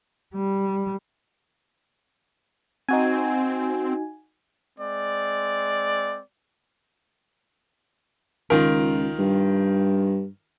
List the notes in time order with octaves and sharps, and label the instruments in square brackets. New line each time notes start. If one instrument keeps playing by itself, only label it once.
[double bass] G3
[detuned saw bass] C4 [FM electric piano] D#4 F#4 G#5
[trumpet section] G#3 C4 D5
[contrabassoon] C#2 [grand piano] D#3 F4 A#4
[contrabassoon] G2